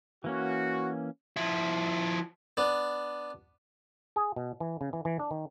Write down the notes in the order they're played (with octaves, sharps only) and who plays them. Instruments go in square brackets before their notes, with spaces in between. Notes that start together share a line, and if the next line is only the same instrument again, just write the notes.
[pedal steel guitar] E3 A#3 C#4 [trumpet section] F#4
[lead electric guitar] F3 E4
[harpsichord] B3 D4
[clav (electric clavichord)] G#4
B2
E3
C#3
E3
E3
D4
D#3